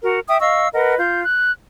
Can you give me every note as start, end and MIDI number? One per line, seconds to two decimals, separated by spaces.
0.03 0.18 66
0.03 0.18 70
0.27 0.39 76
0.27 0.39 79
0.27 0.39 87
0.40 0.67 75
0.40 0.67 77
0.40 0.67 85
0.40 0.67 88
0.73 0.96 70
0.73 0.96 71
0.73 0.96 75
0.73 0.96 78
0.98 1.22 65
0.98 1.22 91
1.23 1.51 90